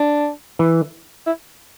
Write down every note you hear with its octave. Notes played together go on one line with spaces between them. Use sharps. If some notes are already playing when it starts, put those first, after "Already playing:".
Already playing: D4
E3
E4